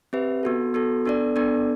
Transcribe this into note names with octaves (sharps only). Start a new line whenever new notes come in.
C4 G4 B4 E5
B3 F#4 A4
B3 F#4 A4
B3 D4 A4 D5
B3 D4 A4 D5